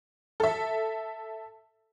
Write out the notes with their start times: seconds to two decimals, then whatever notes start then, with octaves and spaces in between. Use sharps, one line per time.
0.40 A4 E5